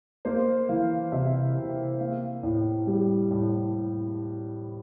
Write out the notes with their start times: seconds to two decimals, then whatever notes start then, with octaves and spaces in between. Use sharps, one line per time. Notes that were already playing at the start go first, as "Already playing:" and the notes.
0.25 A#3 C5
0.69 E3 F5
1.12 C3 E5
1.56 C3 G5
2.00 A#3 F5
2.43 A2
2.87 G3
3.31 A2